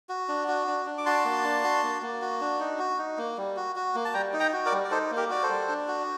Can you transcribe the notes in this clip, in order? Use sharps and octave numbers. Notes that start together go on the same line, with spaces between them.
F#4
D4
F#4
D4
D4
D6
F#4 A5 C6
A#3
D4
F#4
A#3
A#3
F#4
D4
D#4
F#4
D#4
A#3
G3
F#4
F#4
A#3
A5
G3 G5 A#5
D#4
G5 A#5
F#4
A#4 D5
G3
D5
D#4 A4 C5
A#3
G4 A#4
F#4 D5
A4 C5
G3
D4
F#4